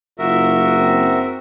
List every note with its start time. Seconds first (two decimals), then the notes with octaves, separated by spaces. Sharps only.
0.19 F#1 F4 F#4 A#4 E5
0.77 C4